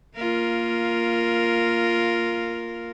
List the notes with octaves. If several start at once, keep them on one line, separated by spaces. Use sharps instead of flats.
A#3 F4 A#4